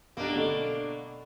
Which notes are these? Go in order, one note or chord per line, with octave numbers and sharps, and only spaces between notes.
B1 A#3 D4 G4
B2 D3 A3